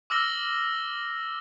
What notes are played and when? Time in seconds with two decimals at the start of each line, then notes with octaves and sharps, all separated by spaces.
0.10 D6 E6 F6 A#6 G7